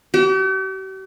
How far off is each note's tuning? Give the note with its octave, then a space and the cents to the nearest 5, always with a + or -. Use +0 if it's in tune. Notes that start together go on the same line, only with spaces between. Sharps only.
G4 -45